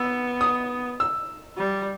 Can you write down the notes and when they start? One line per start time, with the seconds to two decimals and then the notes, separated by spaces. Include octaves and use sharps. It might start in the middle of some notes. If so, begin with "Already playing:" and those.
Already playing: B3 E6
0.41 D#6
1.00 E6
1.58 G3